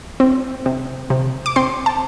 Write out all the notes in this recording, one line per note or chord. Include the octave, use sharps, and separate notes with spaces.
C4
C3
C3
D6
C4 C6
A5